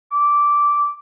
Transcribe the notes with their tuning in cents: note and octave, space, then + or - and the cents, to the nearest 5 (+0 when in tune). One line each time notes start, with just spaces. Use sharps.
D6 -10